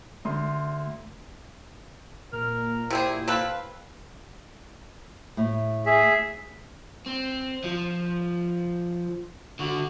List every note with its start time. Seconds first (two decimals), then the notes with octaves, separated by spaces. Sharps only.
0.25 D2 C6
2.33 A#2 A#4 F6
2.90 C3 C4 E4 G4 G#4
3.28 C4 A4 B4 F5
5.37 A2
5.86 G#4 E5
7.06 C4
7.64 F3
9.59 D3 F#4